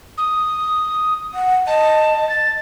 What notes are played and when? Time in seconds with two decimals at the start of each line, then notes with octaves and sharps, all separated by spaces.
0.18 D#6
1.34 F#5
1.67 D#5 A5
2.29 A6